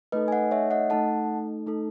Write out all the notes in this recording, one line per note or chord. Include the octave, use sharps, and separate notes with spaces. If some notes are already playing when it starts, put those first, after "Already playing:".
A3 D#4 A4 B4 D#5
G#5
D#5 F#5
C#5 E5
D#5 F#5
A3 D#4 A4 F#5 A5
A3 D#4 A4